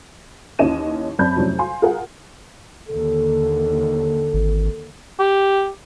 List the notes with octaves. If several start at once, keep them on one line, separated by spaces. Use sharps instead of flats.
D#2 E3 C#4 D#5 D#7 E7
F#2 C4 D5 A5 B5 G6
F2 A2 C3 F#3 C#4
F5 G#5 C6
F4 G#4 A#4 F5 F#5
D#2 D3 A4
G#1
G4